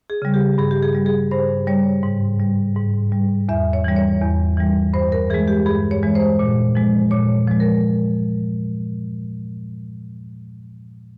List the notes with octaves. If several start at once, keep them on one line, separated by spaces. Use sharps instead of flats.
G#4
C#3 G3
G4
G2 G#4
G4
G#4
G3
G#4
G2 C5
G3 C#5
G#2
G3
G#2
G3
E2 E5
C#5
E3 G3
C#5
E2
E3 G3
G2 C5
A#4
E3 G#3 G#4
G4
G2 G#4
C#5
E3 G#3
C5
A#2
F3 G#3
A#2 C#5
F3 G#3
A#4